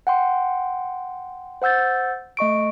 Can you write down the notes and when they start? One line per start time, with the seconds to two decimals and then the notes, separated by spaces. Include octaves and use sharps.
0.07 F#5 G5 C6
1.62 C5 F#5 E6 G6 A6
2.37 A3 D#5 C#6 D7